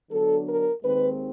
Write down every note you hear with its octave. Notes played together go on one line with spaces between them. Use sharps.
D3 F#3 B3 D4 A4
A#4
D#2 D#3 G#3 C4 B4